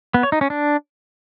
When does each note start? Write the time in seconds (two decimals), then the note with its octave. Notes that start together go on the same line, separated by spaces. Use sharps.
0.14 B3
0.23 C#5
0.32 D#4
0.41 C#4
0.50 D4